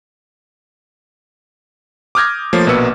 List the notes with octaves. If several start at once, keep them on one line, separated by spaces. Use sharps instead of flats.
D6 D#6 F6 G6 G#6 A#6
F3 A3 A#3 C#5 A6 C7
A#1 B2 A#3 B4 E6 C#7